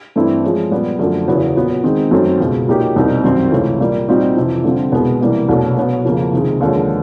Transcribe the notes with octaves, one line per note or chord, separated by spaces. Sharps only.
G2 E3 A3 C4 E4
F3 G#3 C#4
A#2 G3 B3
F#2 D3 F3 A3
E2 C#3 F#3 B3 E4
A#2 F#3 B3
D#3 G#3 C4 D#4
F#2 D#3 F#3 A3 C4
C#2 B2 G#3
A#2 F#3 A#3 D#4 G4
C2 B2 G3 C4 D#4
F#2 D#3 G3 C4
C#2 C3 E3 A3 C#4
A#2 G3 A#3
A#2 G3 C4 D#4 F#4
F2 C3 E3
D3 G3 C4 F4
C2 B2 G#3 B3
C3 E3 G3 A#3
C2 B2 F#3 A3 D4
B2 F#3 B3
F2 C#3 F3 A#3
C#2 C3 D#3 G#3
D#2 D3 F3 G#3 C#4